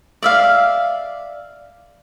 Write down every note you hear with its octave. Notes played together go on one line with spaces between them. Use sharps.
D5 E5 F5